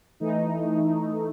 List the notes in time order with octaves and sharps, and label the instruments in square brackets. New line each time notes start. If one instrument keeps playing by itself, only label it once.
[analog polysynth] E3 A3 D#4